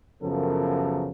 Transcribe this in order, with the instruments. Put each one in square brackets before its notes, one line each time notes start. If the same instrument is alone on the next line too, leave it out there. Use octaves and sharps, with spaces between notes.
[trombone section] F#2 C#3 F3 B3 A4 A#4